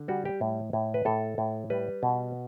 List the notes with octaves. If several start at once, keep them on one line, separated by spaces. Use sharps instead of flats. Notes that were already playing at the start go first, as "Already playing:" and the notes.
Already playing: D3
G3 F#4
G4
A2
A2
B4
A2 A4
A2
G3 B4
B2